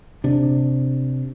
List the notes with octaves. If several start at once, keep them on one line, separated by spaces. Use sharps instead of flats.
C3 D4